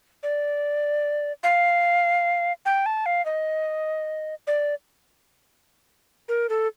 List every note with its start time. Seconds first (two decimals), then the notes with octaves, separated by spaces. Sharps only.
0.23 D5
1.43 F5
2.66 G5
2.86 A5
3.06 F5
3.25 D#5
4.47 D5
6.29 A#4
6.49 A4